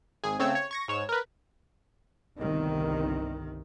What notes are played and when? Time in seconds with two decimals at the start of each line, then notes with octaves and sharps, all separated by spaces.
0.24 G#1 G#4 G#5
0.39 C#3 A3 C4 C#5 E6
0.55 C#5
0.71 C#6 G#6 A#6
0.88 G#2 C#5 E7
1.09 A#4 B4
2.38 G1 C2 D#3